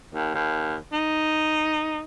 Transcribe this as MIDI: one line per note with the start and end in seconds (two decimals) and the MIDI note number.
0.14 0.30 39
0.34 0.76 39
0.93 2.02 63